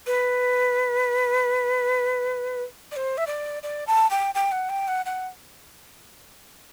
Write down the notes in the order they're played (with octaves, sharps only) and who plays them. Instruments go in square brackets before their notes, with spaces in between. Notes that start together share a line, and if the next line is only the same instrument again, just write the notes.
[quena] B4
D5
C5
E5
D5
D5
A5
G5
G5
F#5
G5
F#5
F#5